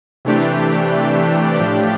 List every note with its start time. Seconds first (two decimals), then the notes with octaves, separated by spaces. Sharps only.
0.25 C3 E3 A3 D4 G4
1.57 A2 F3 A3 D4 G4